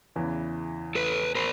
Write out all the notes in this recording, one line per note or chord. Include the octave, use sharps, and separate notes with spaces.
E2 C#3 E3
A4 B4
A#4 C5